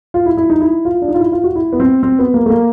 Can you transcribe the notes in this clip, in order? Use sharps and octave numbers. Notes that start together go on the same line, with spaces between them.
F4
E4
E4
D#4
E4
F4
D4
D#4
F4
E4
F4
F#4
E4
B3
C4
C4
B3
A#3
A3
A#3